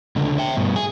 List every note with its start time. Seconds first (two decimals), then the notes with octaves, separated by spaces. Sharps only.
0.16 C#2 D3
0.39 E5 G5
0.57 G2 B2
0.76 G#4